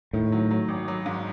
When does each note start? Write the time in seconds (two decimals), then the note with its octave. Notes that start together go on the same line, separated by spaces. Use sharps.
0.13 A2 D#3
0.32 F#3
0.51 F#3
0.68 G#1
0.88 F#3
1.06 G#2